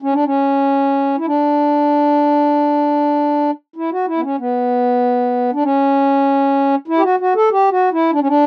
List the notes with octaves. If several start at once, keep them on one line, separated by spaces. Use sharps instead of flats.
C#4
D4
C#4
E4
D4
E4
F#4
E4
B3
C#4
B3
D4
C#4
E4
G4
F#4
F#4
A4
G4
F#4
E4
D4
C#4
D4